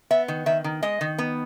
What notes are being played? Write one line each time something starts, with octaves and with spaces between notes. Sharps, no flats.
B3 E5
D#3
D#3 E5
D#3
G#3 D#5
D#3
B3